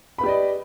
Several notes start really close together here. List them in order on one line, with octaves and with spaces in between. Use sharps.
B5 B4 G4 D5 D#5